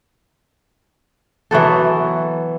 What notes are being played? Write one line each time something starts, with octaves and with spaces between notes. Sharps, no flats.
E3 F#3 B3 A4